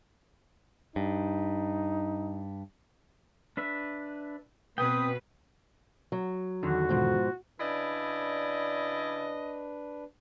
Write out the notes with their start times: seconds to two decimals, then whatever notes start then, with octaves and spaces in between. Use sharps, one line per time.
0.96 G2 D#4
3.57 D4 B4 E5
4.78 B2 C4 B4 G5 D#6
6.12 F#3
6.63 E2 D3 D#3 F#4
6.89 G#2 B2 F3
7.60 C#3 D4 E4 B4 D5 D#5